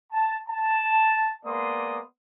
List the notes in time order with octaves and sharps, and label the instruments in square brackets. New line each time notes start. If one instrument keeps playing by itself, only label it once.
[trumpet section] A5
A5
G#3 A#3 B3 D5 C6 D#6